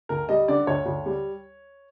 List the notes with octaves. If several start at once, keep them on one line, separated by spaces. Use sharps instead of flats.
D2 A#4
G3 D#5
D3 D5
D2 C#5
D2
G3